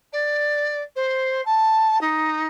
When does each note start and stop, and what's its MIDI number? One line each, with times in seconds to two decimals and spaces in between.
0.12 0.81 74
0.95 1.41 72
1.45 1.98 81
2.01 2.47 63